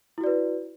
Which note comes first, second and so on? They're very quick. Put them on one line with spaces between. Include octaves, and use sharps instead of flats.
E4 F#4 D5 B4